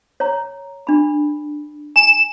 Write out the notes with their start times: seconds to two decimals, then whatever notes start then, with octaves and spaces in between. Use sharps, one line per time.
0.20 C#5 A#5
0.87 D4 B5
1.96 G#5 E7